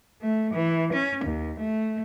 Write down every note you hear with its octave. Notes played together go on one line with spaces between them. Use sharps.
A3
E3
C#4
D#2
A3